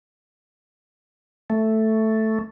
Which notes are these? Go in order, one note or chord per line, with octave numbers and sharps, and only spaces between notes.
A3